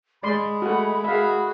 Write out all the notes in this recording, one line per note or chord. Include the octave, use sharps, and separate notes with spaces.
G#3 D5 B5 C6
A3 F#4 F#5
F#4 G#4 E5 F5